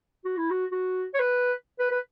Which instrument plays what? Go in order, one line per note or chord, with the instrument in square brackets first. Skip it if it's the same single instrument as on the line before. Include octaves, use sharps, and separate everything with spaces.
[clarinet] F#4
E4
F#4
F#4
C#5
B4
B4
B4